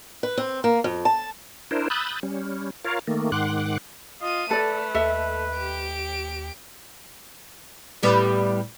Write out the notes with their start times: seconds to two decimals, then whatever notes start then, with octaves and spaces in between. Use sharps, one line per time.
0.23 B4
0.37 C4
0.64 A#3
0.84 F2
1.05 A5
1.71 D4 E4 A#4 C5
1.90 B5 D#6 E6 F#6 G6 A6
2.23 G3 C#4
2.85 F4 A#4 C#5 F5
3.07 D#3 A3 A#3
3.32 G#2 D#3 F#5 C6 D6 F#6
4.22 F4 D#5 D#7
4.51 A3 A4 B4 D5
4.94 D#2 A4 D#5 E5
5.56 G4 D7
8.03 A2 G3 B3